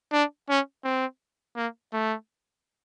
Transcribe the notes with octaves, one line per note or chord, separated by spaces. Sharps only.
D4
C#4
C4
A#3
A3